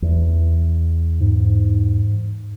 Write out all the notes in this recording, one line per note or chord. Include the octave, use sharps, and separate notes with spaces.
E2
G#2